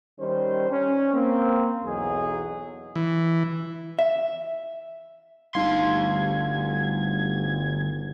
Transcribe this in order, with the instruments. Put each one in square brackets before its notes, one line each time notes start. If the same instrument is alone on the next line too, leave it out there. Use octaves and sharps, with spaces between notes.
[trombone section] D#3 G3 C#4 C5
C#4
A#3 C4
B1 E2 F#3 D#4 G#4
[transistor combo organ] E3
[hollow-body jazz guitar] E5
[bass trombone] G1 [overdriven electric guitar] D2 C6 [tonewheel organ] G3 G#6 [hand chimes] D#4 F5